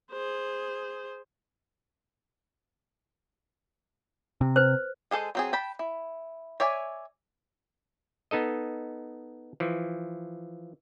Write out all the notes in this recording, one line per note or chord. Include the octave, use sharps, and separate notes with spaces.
G#4 C5
C3
B4 C5
G#3 G#4 A4 C5
F#3 C4 G#4
G5 A5 B5
E4
C#5 D5 E5 G#5
B3 D#4 A4 D#5
E3 F3